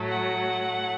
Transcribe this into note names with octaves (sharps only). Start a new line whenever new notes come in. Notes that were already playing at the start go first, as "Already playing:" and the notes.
Already playing: A2 F#3 A3
F#5